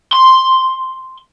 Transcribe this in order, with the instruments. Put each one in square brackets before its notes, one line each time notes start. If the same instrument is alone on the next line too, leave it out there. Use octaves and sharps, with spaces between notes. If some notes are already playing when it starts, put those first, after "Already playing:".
[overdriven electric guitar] C6